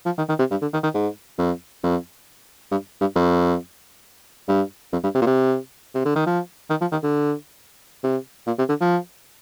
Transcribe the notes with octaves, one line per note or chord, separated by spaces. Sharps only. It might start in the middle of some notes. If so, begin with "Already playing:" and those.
F3
D#3
D#3
C3
G2
D3
D#3
D#3
G#2
F2
F2
G2
G2
F2
G2
F2
G2
C3
A#2
C3
C3
D3
D#3
F3
D#3
F3
D#3
D3
C3
A#2
C3
D3
F3